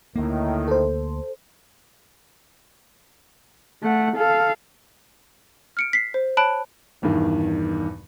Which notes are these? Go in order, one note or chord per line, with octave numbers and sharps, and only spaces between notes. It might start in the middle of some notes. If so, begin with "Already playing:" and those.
D2 A2 D#3 A#3
A4 C5
A3 F#5
A4 F5
F6 C#7 D7
B6 C7
C5
C#5 A5 B5 F#6 D7
E1 E2 G2 D#3